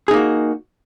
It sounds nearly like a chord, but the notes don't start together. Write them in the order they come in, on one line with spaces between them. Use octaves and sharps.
G#4 D#4 A#3 F#4